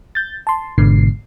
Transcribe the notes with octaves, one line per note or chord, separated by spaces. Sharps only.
G6 A6
A5 C6
G#1 G#2 B2 D3 C7